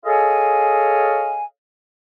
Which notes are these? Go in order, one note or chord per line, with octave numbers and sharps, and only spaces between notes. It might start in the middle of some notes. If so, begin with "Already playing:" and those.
G#4 A4 C#5 D#5 F5 G#5